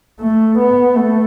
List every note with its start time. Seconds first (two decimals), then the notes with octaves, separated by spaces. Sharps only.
0.21 A3
0.59 B3
0.96 A3